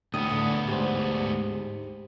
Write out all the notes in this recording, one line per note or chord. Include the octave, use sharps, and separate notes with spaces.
D2 A2 D3 B3 D#6
A2 D3
G#2 G4 C5